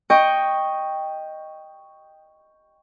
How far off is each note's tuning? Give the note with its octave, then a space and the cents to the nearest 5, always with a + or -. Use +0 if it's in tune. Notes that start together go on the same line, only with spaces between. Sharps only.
D#5 +0 G5 +5 C#6 +0